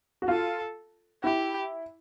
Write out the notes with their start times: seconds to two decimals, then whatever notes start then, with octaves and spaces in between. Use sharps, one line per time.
0.22 F#4
0.28 F4 A4
1.23 E4 G4